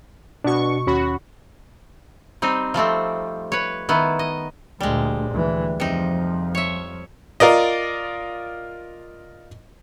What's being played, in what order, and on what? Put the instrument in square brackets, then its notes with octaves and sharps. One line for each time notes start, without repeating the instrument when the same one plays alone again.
[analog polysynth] B2 C#6 [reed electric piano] D4 F#4
[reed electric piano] D#2 C#4 B5 [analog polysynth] F#4
[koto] G3 C4 D#4
F3 G3 A3 C4
B4 C#5
D#3 B3 E4
D#5
[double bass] D2 A#2 [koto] G3 G#3
[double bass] D2 E3
[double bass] F2 F3 [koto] C3 D#4
[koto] C#5 E5
[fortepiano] F4 A#4 D5 D#5